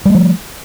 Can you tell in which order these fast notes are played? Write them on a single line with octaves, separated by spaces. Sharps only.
G3 A3 F3